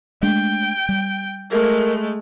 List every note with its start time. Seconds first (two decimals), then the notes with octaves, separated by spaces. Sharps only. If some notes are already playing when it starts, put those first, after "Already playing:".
0.23 G#3 A3 D4 G5
0.89 G3
1.51 G#3 A3 A#4